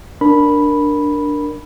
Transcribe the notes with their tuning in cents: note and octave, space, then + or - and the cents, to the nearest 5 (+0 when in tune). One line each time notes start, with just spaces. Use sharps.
D4 +0 A#4 +0 B5 -5